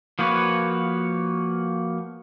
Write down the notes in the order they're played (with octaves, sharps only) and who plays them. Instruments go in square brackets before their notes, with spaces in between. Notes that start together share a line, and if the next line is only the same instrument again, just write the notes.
[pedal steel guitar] F3 A#3 F#4 B4 C#5